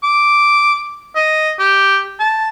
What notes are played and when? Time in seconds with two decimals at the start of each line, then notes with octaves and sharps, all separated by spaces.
0.03 D6
1.15 D#5
1.59 G4
2.20 A5